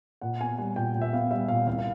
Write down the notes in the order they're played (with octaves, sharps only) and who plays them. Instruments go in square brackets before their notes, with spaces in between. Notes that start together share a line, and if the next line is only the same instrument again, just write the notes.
[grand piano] A#2 F#5
B3 G#5
G3 G#5
A#2 G5
A#2
E5
B3 F5
G3 E5
A#2 F5
C2 F5
F5